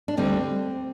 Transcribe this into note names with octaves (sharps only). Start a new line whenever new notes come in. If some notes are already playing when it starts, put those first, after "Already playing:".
D4
D2 D3 G3 C4